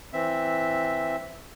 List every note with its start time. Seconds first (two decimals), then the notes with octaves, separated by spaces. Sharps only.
0.13 E3 C4 E5